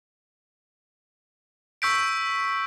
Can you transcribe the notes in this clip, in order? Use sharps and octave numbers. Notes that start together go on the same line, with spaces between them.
C#6 E6 G6 B6 D7